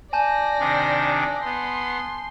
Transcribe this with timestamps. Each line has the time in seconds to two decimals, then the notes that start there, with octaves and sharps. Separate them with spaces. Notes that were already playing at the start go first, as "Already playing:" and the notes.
0.13 D5 G#5 A5 G6 A#6
0.59 C3 D#3 D4
1.45 B3 C6